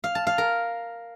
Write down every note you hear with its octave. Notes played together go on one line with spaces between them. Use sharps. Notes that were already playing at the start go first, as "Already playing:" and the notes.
F5
A5
F5
A#4